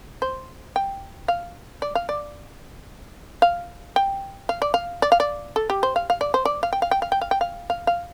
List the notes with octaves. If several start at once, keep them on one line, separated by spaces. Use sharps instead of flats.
C5
G5
F5
D5
F5
D5
F5
G5
F5
D5
F5
D5
F5
D5
A4
G4
C5
F5
F5
D5
C5
D5
F5
G5
F5
G5
F5
G5
F5
G5
F5
F5
F5